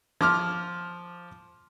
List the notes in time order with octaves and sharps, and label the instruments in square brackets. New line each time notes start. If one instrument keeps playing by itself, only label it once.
[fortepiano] F3 D6 F6